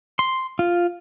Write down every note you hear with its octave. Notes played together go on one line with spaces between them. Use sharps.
C6
F4